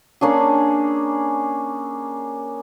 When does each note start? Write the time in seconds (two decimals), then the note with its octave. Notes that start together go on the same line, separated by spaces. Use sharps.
0.21 A#3 C#4 D4 G#4